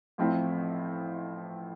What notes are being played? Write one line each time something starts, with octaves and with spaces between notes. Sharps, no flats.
A1 A2 F3 C4 E4